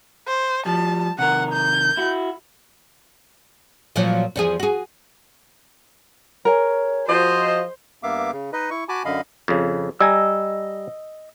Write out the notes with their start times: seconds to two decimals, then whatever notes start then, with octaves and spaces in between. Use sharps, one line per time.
0.28 C5
0.66 F3 G3 A5
1.19 C3 D#3 A#4 F#5
1.53 G6
1.97 E4 F#4
3.96 A#2 F3 F#3
4.36 E2 F3 G#4
4.60 F#4 G#4
6.45 G#4 A#4 C#5
7.08 F3 F#4 C5 D#5
8.03 G2 A#3 B3 E5 F5 D6
8.33 C#3
8.53 D#4 B4 D#5
8.71 E4 C#6
8.89 F#4 G#5 A5 B5 D6
9.05 F#2 D3 D#5 F5 B5
9.48 F2 C#3
10.01 G3 D#5 G#5 A#5 E6